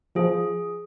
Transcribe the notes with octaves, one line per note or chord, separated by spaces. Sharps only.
F3 G#4